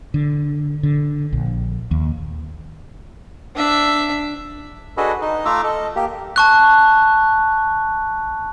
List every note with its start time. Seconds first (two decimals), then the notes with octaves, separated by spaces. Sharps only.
0.14 D3
0.83 D3
1.33 A#1
1.91 D#2
3.56 D4 E5
4.97 D4 F#4 G#4 A4 B4 D#5
5.21 D#4 D#5
5.45 A3 F4 E5 A#5 D6 E6
5.64 A4 D#5
5.96 A#3 G4
6.36 A5 C#6 F#6